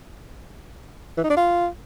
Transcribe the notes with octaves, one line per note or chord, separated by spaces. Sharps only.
E3
D#4
D4
F4